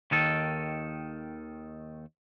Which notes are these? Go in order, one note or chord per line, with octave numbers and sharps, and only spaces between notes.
D#2 D#3 A4